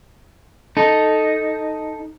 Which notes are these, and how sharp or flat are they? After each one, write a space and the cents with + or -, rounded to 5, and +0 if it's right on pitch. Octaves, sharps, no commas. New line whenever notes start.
D#4 +0 A4 +0